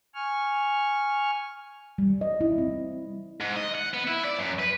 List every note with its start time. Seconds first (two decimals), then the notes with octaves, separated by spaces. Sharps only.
0.15 G#5 C#6 F6
1.98 G3
2.21 D#5
2.41 E4
2.58 C4
3.41 G#2
3.56 D#5
3.75 F#5
3.94 B3
4.07 E4
4.24 D5
4.39 F#2
4.59 B4